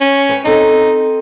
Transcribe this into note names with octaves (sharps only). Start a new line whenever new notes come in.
C#4
B4 G5
C4 D#4 A4